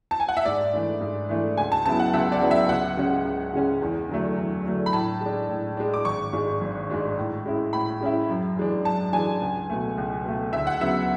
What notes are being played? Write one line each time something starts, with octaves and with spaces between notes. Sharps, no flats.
A5
G#5
F#5
E5
G#2 D5
E3 A3 D4
G#2
E3 A3 D4
C#2 G#5
A5
C#3 F#3 B3 E4 A5
F#5
C#2 E5
D5
C#3 F#3 B3 E4
E5
C#2 F#5
C#3 G#3 C#4
C#2
C#3 G#3 C#4
E2
D3 F#3 A3
E2
D3 F#3 A3
B5
A2 A5
G#3
D4
A2
G#3 D4
D6
G#1 C#6
G#2 G#3 D4
G#1
G#2 G#3 D4
A2
G#3 C#4 E4
A2 B5
G#3 C#4 E4
F#2
E3 G#3 D4
F#2 A5
E3 G#3 D4 G#5
C#2
B2 A3
C#2
B2 A3
D2 E5
F#5
C#3 F#3 B3 E5